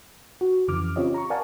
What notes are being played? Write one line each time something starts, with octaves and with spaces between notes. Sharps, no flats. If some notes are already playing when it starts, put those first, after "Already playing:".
F#4
F2 C#3 E3 D6 F6
C4 C#4 F4 G4 C#5 D#5
A#5 C#6
A#4 D5 F5 F#5 G#5 A5